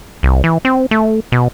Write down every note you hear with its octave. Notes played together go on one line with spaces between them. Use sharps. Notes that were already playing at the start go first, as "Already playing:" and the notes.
C2
E3
C4
A3
B2